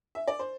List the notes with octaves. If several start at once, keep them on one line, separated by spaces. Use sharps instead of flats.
E5
D5
C5